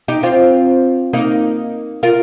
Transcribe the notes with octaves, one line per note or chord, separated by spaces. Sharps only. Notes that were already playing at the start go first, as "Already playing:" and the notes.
D#4 G4
C4 F4
A#3 D#4
F4 A#4